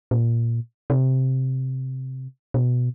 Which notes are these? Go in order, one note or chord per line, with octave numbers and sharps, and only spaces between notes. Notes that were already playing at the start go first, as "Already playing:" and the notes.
A#2
C3
B2